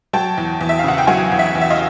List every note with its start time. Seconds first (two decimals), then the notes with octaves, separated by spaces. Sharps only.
0.13 F#3 G5 A5
0.37 E2
0.61 E2
0.69 E5
0.79 F5
0.84 C#3 F#5
0.98 G5
1.07 F#3 F#5 G#5
1.32 E2
1.39 E5 F#5
1.55 E2
1.61 E5
1.70 D#5 F5